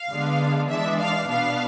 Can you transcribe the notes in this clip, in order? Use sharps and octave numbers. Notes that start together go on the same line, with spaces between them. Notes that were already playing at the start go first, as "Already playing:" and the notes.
Already playing: F5
D3 G#3 B3 D4
E3 G#3 D4 E5
F5
B2 B3 D4 F5